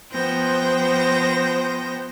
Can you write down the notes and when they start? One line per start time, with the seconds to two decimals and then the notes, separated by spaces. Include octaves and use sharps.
0.13 F3 B3 C5 G5 G6 A#6